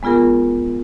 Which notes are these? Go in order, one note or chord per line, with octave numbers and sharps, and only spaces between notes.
G#3 B3 F4 G#4 A#4